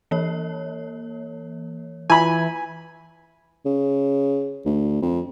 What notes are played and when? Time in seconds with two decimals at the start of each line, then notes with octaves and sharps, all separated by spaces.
0.11 E3 A#3 C#5
2.10 E3 F4 G#5 B5
3.65 C#3
4.65 D2
5.02 F2